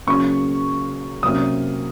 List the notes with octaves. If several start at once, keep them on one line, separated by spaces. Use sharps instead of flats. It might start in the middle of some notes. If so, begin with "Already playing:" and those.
C#3 F#3 A#3 C#4 C#6
C3 F#3 A#3 C#4 D#6